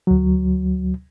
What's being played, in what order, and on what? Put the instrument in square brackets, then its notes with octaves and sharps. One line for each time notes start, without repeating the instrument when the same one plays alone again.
[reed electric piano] D2 F#3